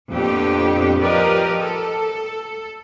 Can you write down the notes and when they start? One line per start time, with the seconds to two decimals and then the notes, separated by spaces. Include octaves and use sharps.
0.11 F2 A#2 B3 D4 G4
1.00 F3 G4 A#4 B4 D5 D#5
1.60 A4